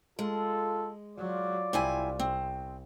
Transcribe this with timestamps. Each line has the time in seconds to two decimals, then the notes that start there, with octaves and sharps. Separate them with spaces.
0.19 G#3 F4 A4
1.17 F#3 F4 D5
1.73 C2 C4 E4 G#5
2.20 C4